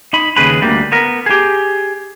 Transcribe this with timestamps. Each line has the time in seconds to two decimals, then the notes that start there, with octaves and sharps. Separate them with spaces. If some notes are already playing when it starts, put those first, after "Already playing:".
0.13 D#4 B5
0.37 D#2 C#3 G#4 B4 B5
0.61 D2 G3 A#3
0.92 B3 A#4
1.26 G4 G#4